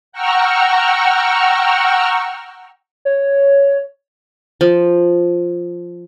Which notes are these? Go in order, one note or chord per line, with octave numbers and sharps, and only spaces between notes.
F#5 G5 A#5 C#6 E6 F6
C#5
F3